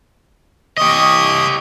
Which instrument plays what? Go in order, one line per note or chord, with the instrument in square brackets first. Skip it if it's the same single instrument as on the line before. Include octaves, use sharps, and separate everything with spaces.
[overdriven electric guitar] G4 D#5 [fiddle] C#6 D#6